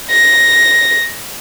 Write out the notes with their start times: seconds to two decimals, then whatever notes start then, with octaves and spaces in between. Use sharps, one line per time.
0.11 A#6